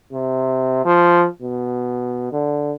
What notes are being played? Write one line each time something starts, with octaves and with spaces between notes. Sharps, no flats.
C3
F3
B2
D3